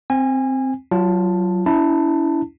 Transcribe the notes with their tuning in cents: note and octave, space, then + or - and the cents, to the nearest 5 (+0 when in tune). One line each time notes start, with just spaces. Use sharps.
C4 +0 G#5 -25
F#3 +15 F4 -20 A5 +0
C#4 +40 E4 -10 A5 +15